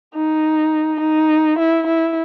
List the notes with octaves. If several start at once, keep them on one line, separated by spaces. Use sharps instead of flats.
D#4
D#4
E4
E4